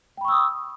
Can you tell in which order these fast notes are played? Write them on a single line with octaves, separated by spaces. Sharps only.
G5 B5 C#6 E6 D#6